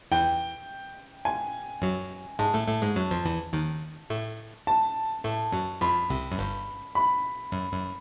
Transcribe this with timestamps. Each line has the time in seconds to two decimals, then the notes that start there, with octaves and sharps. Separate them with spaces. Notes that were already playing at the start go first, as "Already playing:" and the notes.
0.11 E2 E3 G5
1.25 G#5
1.82 F#2 F#3
2.39 G#2 G#3 A5
2.54 A2 A3
2.68 A2 A3
2.82 G#2 G#3
2.96 F#2 F#3
3.11 F2 F3
3.25 E2 E3
3.53 D#2 D#3
4.10 A2 A3
4.67 A5
5.24 A2 A3
5.52 F#2 F#3
5.81 F2 F3 B5
6.10 C2 C3
6.32 F#2
6.38 G1 G2
6.95 B5
7.52 F#2
7.72 F#2